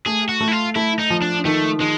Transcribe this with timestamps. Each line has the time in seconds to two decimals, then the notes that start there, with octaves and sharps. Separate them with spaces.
0.06 A3 G#4
0.29 F#4
0.41 A3
0.48 E4
0.52 F4
0.76 A3 E4
0.99 D#4
1.10 F3
1.22 D4
1.45 D#3 A3
1.80 D#3 G#3